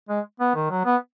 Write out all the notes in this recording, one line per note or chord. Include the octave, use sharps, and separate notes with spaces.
G#3
B3
D#3
F#3
B3